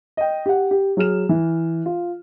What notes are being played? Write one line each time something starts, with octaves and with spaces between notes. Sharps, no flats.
D#5 G5
G4 F#5
G4
F#3 G#4 F6 E7
E3
F4